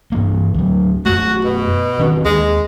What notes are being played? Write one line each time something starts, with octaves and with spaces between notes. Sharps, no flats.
G2 E3 A#3
D2 F#3
F#2 A3 F#4
B2
D#3 C4 D4
D#2 G#3